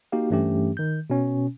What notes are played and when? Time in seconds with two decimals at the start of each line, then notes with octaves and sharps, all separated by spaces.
0.12 A#3 D#4 F#4 G4 F5
0.30 G2 E3 A3 C#4 G4
0.77 D#3 G6
1.10 B2 C#4